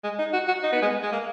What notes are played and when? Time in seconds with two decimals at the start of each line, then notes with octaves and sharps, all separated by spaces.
0.04 G#3
0.19 D#4
0.33 F#4
0.48 F#4
0.63 D#4
0.72 B3
0.82 G#3
1.02 G#3
1.12 A#3